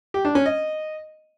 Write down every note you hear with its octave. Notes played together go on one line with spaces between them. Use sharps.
G4
D4
C#4
D#5